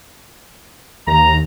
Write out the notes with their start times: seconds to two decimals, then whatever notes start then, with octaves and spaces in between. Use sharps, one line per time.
1.07 D#2 A#5